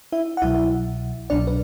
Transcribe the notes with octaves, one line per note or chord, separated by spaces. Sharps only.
E4 E5
F#5
C2 B2 F#3 E4 E5
C2 B2 F#3 D4 D5
B4